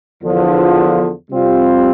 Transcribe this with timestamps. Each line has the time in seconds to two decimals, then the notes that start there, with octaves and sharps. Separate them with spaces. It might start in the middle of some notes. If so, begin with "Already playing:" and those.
0.24 E2 D3 F3
1.30 C3 G3 C4 F4